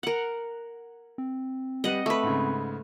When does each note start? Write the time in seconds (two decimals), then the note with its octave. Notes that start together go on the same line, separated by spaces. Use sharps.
0.03 A#4 F#5 F#7
1.18 C4
1.84 G3 B4 D#5 F#5 D#7
2.06 A3 B4 D6
2.23 G#2 C#3